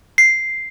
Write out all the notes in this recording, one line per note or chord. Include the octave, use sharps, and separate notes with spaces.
C7